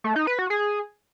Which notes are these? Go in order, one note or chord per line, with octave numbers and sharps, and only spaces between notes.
A3
D#4
B4
F#4
G#4